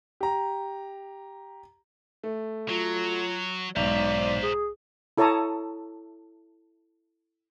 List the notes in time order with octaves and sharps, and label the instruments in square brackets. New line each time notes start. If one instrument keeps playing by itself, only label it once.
[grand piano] G4 A#5
A3
[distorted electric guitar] F#3 [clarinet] F4
[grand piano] B1 G#2 [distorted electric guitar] C5 A#5 [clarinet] D5
[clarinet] G#4
[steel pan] E4 A4 C#5 A5 A#5 D#6